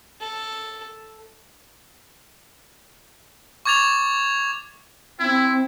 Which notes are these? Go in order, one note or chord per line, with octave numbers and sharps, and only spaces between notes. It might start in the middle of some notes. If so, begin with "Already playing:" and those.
A4
C#6 D6 G#6 A6 F7
C4 E4